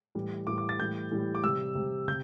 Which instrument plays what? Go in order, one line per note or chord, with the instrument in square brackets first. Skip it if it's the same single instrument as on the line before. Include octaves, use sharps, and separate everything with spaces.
[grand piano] A2 E3 G3
A2 E3 G3 D6
D6
A6
A2 E3 G3 G6
A2 E3 G3
D6
C3 G3 E6
C3 G3
C3 G6